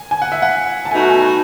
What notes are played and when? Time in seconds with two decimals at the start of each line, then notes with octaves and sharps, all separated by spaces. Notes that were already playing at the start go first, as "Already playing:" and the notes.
Already playing: G#5
0.11 G#5
0.22 F#5
0.32 E5
0.42 F#5
0.85 A5
0.91 B2 A3 D#4 F#4 G#5
1.10 G#5
1.22 A5